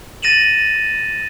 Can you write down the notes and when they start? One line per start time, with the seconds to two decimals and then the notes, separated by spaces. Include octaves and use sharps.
0.22 A6 A#6 D#7 E7 F#7